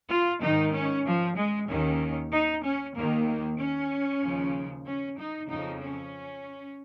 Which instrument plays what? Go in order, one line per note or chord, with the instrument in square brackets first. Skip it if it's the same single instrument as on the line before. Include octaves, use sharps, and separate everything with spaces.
[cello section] F4
G#2 D#3 D#4
C#4
F3
G#3
D#2 D#3 C#4
D#4
C#4
D#2 D#3 A#3
A#3
C#4
D#2 C#3 F3
C#4
D#4
F2 C#3 F3 D#4
C#4